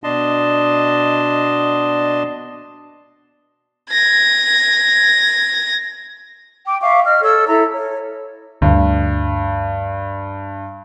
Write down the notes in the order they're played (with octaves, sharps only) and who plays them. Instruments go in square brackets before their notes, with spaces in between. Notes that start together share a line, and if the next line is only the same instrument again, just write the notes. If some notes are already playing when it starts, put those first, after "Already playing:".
[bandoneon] B2 D4 D#5 A5 C6
[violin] G#6 A#6
[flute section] G5 D6
E5 F5 C#6 D6
D#5 F6
A4 C#5 E6
E4 A4 E5 A#5
C#5
[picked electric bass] D2 [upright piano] G2